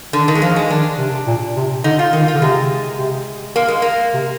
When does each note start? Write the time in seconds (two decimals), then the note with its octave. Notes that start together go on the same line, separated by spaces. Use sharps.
0.13 D3 D#3
0.28 D#3
0.35 G#3
0.42 F3 A#3
0.56 G#3
0.70 D#3 D4
0.98 C3
1.27 A#2
1.56 C3
1.84 D3 D#4
1.99 F4
2.13 D#3 D#4
2.28 F4
2.34 D3
2.42 C3 G#3
2.99 C3
3.56 A#3
3.68 G#3
3.82 A#3
4.14 C3